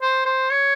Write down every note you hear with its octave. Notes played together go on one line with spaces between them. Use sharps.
C5
C5
C#5